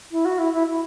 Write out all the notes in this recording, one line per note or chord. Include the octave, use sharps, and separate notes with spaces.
E4
F#4
E4
E4
E4